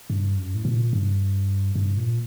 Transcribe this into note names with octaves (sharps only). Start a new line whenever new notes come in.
G2
F#2
A2
A#2
G2
G2
A#2